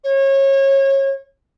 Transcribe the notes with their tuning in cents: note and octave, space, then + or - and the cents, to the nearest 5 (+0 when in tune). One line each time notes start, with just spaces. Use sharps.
C#5 -30